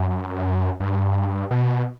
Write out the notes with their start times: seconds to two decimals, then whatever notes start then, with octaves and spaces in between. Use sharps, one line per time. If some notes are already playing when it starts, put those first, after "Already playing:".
Already playing: F#2
0.80 G2
1.51 B2